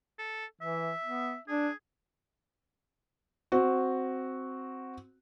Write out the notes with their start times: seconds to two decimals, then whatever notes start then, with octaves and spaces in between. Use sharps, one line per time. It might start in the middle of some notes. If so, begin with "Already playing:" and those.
0.19 A4
0.61 E3 E5
1.04 B3
1.48 D4 G#4
3.52 C4 F#4